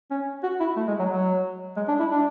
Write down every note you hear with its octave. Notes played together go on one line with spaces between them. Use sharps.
C#4
F#4
E4
A3
G#3
F#3
F#3
G#3
D4
E4
D4